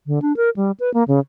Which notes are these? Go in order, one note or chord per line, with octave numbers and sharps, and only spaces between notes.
D3
D4
A#4
G3
B4
A#3
C#3